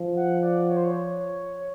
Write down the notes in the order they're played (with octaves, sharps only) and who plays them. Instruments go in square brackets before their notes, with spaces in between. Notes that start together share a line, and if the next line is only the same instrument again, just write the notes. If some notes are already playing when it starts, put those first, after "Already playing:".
Already playing: [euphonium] F3
[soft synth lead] F#5
D5
C#5
C5
C#5